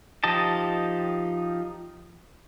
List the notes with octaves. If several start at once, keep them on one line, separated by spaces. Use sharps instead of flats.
F3 D#4 G4 D#5 A5